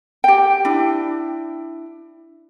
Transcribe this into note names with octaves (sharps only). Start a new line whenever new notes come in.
G4 G5
D4 E4